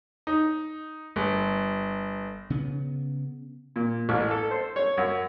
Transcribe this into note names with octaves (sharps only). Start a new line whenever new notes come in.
D#4
G1
C#3 B3
A#2
A1
A4
C5
C#5
F#2